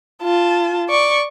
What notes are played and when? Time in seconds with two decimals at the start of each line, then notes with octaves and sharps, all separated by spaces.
0.23 F4 A5
0.89 D5 C#6